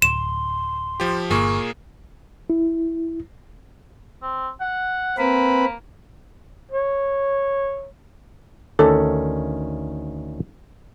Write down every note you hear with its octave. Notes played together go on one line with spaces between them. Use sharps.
D1 C6 E7
F3 G4
G1 A#2 A#3 G#4 C#6
E4
C4
F#5
A#3 C4 B4 B5
C#5
D2 D#3 C#4 A4